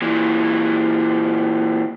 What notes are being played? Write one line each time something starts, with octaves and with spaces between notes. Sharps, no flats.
A#2 E3